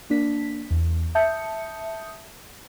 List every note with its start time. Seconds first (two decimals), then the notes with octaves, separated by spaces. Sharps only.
0.10 A#3 D4 B6
0.71 E2
1.15 E5 A5 D#6 G6 C#7